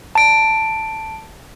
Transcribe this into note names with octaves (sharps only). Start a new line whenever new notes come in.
A5 D7